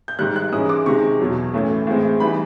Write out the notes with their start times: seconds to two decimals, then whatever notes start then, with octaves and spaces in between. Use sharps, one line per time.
0.08 G6
0.19 G#2 D#3 G3 F#6
0.36 F#6
0.52 G#2 E3 G#3 C#4 E4 D#6
0.69 D6
0.86 C3 D#3 G#3 C#6
1.19 E2 B2 F#3
1.54 A2 E3 A3 C#4
1.87 A2 E3 G#3 C4
2.20 E3 G3 B3 D#4 B5